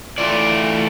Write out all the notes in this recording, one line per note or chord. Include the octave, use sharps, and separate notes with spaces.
E3 A3 E4 F4 D5